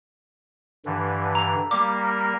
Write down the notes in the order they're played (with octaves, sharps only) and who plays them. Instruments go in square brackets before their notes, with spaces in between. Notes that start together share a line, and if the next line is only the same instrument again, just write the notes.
[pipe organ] G2 D3 E3
[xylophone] A#5
[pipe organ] G3 A#3 A#4 [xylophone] D6